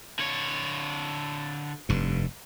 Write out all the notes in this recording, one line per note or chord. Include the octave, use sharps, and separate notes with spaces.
D3 C#5
F1 G2